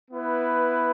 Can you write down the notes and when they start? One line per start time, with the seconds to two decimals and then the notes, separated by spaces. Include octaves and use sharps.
0.11 B3 E4 B4